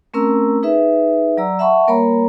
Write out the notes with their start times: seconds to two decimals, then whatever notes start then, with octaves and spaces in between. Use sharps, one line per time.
0.14 A3 C4 C#4 A#4 A#5 E6
0.63 D#4 G#4 B4 E5
1.37 F#3 D5 A#5 E6
1.59 E5 F#5 A5 B5 C#6
1.87 G3 A#3 A#4 C#5 A#5 B5